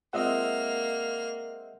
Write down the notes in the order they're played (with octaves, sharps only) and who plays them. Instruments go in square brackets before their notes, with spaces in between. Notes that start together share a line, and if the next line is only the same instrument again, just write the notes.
[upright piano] G#3 C4 F4 [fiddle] A#3 F6 [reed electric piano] D#5 E5 F#5